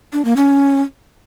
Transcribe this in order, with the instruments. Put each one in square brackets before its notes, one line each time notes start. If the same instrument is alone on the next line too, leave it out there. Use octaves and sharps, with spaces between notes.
[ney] D4
A#3
C#4